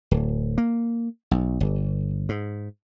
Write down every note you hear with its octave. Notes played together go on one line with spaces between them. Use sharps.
D1
A#3
B1
G1
G#2